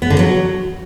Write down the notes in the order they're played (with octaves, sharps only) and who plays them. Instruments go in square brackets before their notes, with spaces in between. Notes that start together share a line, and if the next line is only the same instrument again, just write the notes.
[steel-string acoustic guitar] B3
D3
F#3